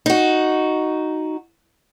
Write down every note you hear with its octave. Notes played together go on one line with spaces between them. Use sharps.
D#4 F#4